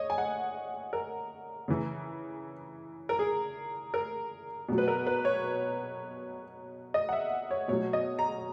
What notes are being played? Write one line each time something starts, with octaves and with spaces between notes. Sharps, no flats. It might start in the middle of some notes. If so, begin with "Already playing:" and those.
Already playing: C#5 D#5
G#5
F#5
A#4
C#3 E3
A#4
G#4
A#4
B2 F#3
B4
A#4
B4
C#5
D#5
F#5
E5
C#5
B2 F#3 C#5
D#5
A#5